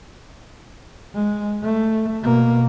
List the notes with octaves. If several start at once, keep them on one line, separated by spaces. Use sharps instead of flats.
G#3
A3
B2 A#3